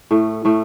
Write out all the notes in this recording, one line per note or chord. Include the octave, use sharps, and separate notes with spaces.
A2 A3
A2 A3